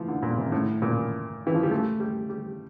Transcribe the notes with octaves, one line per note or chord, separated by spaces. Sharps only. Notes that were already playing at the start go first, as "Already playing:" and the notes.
Already playing: E3 F3 A3
D3
A#2
C3
A2
A#2
E3
F3
G3
A3
G3
G3